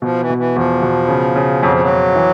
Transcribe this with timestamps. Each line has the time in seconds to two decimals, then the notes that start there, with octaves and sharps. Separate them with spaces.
0.02 B2 F3
0.20 E3
0.29 B2
0.38 E3
0.56 E2 F3
0.83 B2
1.09 C#3
1.36 C#3
1.62 F2 F#3
1.72 F3
1.82 F#3
1.89 F2
2.15 E3